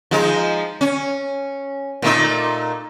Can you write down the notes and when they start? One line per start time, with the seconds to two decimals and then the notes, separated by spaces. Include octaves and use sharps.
0.11 F3 G#3 D#4
0.81 C#4
2.02 A#2 A3 D#4